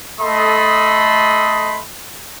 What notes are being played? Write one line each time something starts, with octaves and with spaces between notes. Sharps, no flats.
A3 A4 D#5 B5 C6 D#6